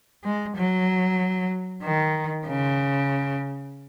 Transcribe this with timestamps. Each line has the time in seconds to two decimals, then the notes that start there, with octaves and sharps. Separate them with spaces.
0.24 G#3
0.57 F#3
1.83 D#3
2.46 C#3